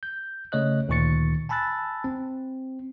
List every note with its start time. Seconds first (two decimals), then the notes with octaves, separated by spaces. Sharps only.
0.03 G6
0.52 C#3 A3 C#5 D#5 F#6
0.89 D2 A#2 D#3 C#6 A6 C#7
1.49 G#5 A5 B5 E6 F#6 A6
2.04 C4